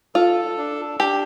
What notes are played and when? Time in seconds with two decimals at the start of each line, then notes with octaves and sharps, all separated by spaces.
0.15 F4 A4
0.58 D4
1.00 D4 G4